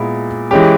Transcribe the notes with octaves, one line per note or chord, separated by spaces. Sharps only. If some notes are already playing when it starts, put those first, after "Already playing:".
Already playing: A#2 G#3 B3 E4
E3 G#3 C#4 G4